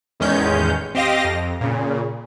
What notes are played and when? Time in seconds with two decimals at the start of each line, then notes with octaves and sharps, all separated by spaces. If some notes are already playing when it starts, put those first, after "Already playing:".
0.20 A1 E2 D#3 G#3 C#4 G6
0.95 C4 G4 D#5 F5 A#6
1.24 F2
1.61 A#2 C#3